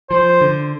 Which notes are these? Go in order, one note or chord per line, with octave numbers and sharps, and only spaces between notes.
F3 C5
D3